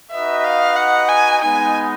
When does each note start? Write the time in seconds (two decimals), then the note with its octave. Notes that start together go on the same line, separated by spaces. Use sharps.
0.11 D#4 F#4 B4 D#5 E5
0.44 F5
0.76 F#5
1.09 G#5
1.42 G#3 B3 D#4 G#5